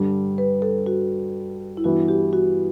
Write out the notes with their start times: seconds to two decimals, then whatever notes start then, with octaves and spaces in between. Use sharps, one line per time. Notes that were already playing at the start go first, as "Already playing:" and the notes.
Already playing: G2 D3 G3
0.38 B4
0.62 A4
0.86 F#4
1.77 E4
1.84 G2 E3 B3 F#4
2.08 G4
2.33 F#4